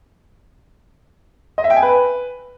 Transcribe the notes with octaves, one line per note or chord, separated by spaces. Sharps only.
D#5
E5
G5
G#5
B4